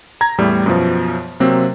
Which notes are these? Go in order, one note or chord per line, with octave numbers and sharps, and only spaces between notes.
A#5 G#6
E2 A2 G3
F#2 B2 F3
C3 F#3 A#3 C4